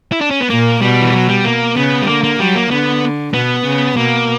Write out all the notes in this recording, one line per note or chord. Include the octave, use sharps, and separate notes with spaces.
E4
D4
C#4
B3
A#2 A#3
B2 G3
E3
F#3
G3
A#3
C#3 B3
G3
D3 A#3
A#3
F#3 G3
A#3
D3 B3
B2 B3
C#3
B2 A#3